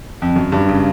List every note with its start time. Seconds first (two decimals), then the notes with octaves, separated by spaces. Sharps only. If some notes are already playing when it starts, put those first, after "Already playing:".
0.22 F2
0.36 F#2
0.52 G2
0.69 C#3